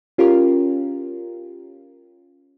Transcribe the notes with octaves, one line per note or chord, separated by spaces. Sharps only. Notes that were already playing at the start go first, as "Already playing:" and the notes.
C#4 F4 G4 A#4